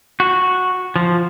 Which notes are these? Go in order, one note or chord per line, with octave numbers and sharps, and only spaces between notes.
F#4
F3